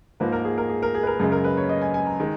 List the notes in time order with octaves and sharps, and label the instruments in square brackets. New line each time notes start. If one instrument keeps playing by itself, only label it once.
[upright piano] G#2 F3 A#3 B4
A#4
G#4
A#4
G#4
A#4
G#4
B4
A#4
F#2 C#3 G#3 G#4
A#4
B4
C#5
D#5
G#5
G#5
A#5
D#3 G#3